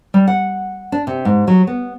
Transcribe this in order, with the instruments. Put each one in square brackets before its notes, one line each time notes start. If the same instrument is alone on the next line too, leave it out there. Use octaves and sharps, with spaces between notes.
[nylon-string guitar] G3
F#5
D4
C3
G#2
F#3
B3